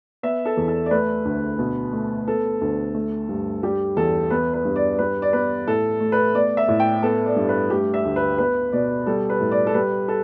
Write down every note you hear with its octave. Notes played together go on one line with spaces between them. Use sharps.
B3 E5
A4
E2
A4
D5
A3 B4
D2
B2
A3
B3 A4
D2
A3
G2
G3 G4
E2 A4
B3 B4
B4
G2
D5
G3 B4
D5
B3 B4
A2 A4
A3
B4
B3 D5
E5
A2
G5
B3 A4
D5
G2
B4
A3 G4
E5
D2
B4
B3 B4
B2 D5
G3 A4
B4
A2
D5
A4
G3 B4
A4